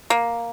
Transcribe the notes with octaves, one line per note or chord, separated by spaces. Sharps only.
A#3